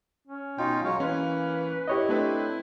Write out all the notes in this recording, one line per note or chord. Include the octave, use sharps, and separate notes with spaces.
C#4
B2 D#4 F4 G5
F#3 G#3 C#5 F5
E3 A#3 C#4 B4
E4 G4 C#5 D#5
A3 C4 D4 B4